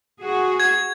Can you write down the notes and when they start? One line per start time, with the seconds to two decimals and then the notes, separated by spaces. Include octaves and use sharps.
0.21 F#4 G#4
0.60 G#6